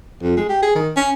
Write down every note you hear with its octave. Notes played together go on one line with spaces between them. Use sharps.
F2
G#3
G4
G#4
D#3
C#4